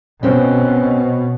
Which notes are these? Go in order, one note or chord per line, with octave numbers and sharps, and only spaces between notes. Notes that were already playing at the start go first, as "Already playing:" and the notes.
B2 C4 C#4